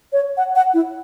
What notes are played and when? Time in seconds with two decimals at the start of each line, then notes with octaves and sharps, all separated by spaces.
0.13 C#5
0.37 F#5
0.55 F#5
0.74 E4